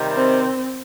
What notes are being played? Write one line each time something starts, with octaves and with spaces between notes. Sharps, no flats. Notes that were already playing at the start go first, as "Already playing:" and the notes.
Already playing: C3 D#3 G3
C4